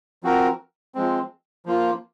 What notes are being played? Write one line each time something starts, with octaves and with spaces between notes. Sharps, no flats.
F3 C4 F#4 A#4
F3 G#3 C4
F3 A#3 F4